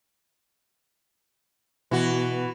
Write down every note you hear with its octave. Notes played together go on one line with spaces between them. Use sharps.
B2 E3 F#4